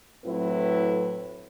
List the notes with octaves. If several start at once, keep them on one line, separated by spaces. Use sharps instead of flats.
A2 F#3 C4 E4 B4